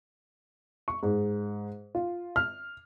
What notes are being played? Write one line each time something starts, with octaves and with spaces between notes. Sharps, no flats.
C#6
G#2
F4
F6